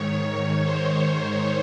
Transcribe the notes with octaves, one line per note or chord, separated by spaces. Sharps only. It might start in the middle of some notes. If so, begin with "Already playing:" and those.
Already playing: G#2 D#3 C#5
C5